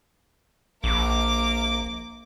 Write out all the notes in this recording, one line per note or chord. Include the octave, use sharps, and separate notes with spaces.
A#1 A#3 D6